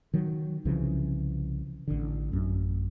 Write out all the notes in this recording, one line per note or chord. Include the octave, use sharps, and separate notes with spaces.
D#3 F#3
C2 C#3 E3 F3
A1 D3
A1 F#2